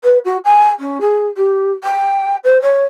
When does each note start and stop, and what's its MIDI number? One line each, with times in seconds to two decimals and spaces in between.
0.04 0.18 71
0.25 0.37 66
0.45 0.68 80
0.79 0.98 61
1.01 1.26 68
1.37 1.72 67
1.84 2.36 79
2.44 2.60 72
2.62 2.85 73